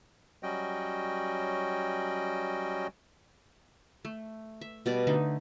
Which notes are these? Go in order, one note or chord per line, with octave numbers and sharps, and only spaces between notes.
F#3 G3 C#4 F#4 D#5 G5
A3
E5
B2 G3 D5
D3 A3 D#4